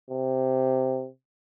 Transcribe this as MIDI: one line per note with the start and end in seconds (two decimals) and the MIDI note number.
0.10 1.07 48